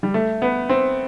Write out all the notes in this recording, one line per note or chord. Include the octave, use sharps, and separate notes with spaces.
G3
A3
B3
C4